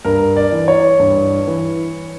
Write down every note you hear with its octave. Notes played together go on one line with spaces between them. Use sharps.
G2 A#4
D5
E3
C#5
G2
E3